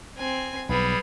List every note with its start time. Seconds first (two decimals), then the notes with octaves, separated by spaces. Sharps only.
0.18 C4 G#5
0.69 B1 G3 G#4 B4 G#6